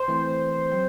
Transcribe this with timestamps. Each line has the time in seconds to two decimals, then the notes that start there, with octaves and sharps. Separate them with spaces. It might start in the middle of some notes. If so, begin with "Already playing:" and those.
Already playing: C5
0.08 E3 A3 C4
0.72 F#3 C4